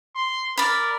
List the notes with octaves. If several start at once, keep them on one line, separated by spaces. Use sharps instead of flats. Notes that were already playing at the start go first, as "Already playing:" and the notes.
C6
A#4 D5 B5